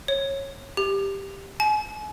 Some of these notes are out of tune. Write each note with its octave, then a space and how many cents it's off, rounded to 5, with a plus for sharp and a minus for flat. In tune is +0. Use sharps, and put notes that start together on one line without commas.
C#5 -15
G4 +5
G#5 +35